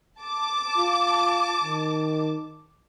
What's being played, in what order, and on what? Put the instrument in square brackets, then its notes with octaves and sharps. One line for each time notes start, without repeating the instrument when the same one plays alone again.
[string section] A5 D6
[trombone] F4
D#3